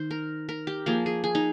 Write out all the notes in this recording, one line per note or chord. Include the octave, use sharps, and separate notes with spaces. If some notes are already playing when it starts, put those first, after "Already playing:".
Already playing: D#3 C5
A#4
A#4
G4
F3 A#3 G#4
G#4
G#4
D#4